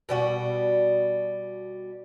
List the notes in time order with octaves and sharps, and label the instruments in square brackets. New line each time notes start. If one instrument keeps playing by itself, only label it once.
[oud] B2 G3 F#4